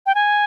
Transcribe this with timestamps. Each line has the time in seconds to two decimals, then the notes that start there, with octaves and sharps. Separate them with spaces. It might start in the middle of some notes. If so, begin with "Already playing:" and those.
0.06 G5
0.15 G#5